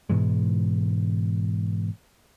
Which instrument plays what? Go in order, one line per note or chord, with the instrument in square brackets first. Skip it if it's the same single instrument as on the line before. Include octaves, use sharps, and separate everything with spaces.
[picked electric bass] G#2 B2 E3 G#3